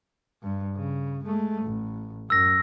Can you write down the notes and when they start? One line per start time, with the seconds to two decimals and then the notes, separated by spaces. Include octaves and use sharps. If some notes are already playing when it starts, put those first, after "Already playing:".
0.43 G2
0.76 C#3
1.24 G#3 A3
1.62 A1
2.30 F#2 E6 A#6